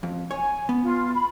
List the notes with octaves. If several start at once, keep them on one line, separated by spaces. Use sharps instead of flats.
F2
C#5 G#5
B3
F4
B5